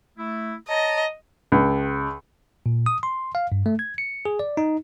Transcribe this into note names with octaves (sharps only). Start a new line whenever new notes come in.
A3 E4
C#5 D#5 A5 A#5
C#2
A#2
D#6
C6
F5
G2
A3
G#6
C#7
G#4
D5
D#4